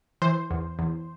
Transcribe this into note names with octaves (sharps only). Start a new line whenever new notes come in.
E3 C5
E2
E2